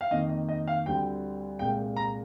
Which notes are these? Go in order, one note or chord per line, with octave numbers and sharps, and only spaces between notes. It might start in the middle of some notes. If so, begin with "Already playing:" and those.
F5
F2 D#3 A#3 D#5
D#5
D#5
F5
D2 D3 G3 C4 G5
C2 A#2 G#3 G5
A#5